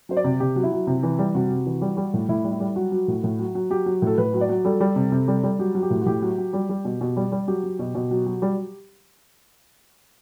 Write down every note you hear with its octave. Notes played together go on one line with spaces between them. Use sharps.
F#3 C5
D5
C3
C3 G4
F#3
E4
F#3
C3
E3
G3
C3 F#4
C3
E3
G3
G3
A2
A2 E4
G3
E4
G3
F#3 F#4
F#3
A2
A2
F#3
F#3
F#3 G4
F#3
A2 A4
A2 B4
F#3
D5
F#3
G3 A4
G3
C3
C3
G3
G3
F#3 G4
F#3
G4
A2
F#4
A2 G4
F#3
F#3
G3
G3
B2
B2
G3
G3
F#3 G4
F#3
B2
B2
F#3
F#3
G3